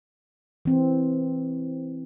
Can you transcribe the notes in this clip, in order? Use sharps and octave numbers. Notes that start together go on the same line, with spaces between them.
E3 C4